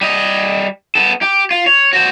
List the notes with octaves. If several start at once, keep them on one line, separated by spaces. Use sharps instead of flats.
G3 D#5
B3 A4
G4
F4
C#5
F#4 C5